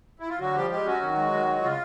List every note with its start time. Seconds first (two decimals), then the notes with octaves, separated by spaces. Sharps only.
0.20 E4
0.29 F4
0.39 D3 F#3 F#4
0.55 F3 G3 G4
0.71 G3 G#3 G4
0.86 F#3 C#4 F#4
1.01 D#3
1.17 G#3
1.32 D#3
1.48 G#3
1.63 C#3 F4